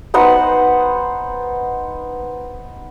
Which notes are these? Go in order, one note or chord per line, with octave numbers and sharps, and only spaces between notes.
B3 D#4 C5 F#5